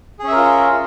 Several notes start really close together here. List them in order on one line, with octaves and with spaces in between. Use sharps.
G#4 C#4 E5 A#4 F4